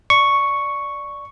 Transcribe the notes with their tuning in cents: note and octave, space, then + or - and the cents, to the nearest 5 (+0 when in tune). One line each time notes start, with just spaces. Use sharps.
D5 +0 C#6 +0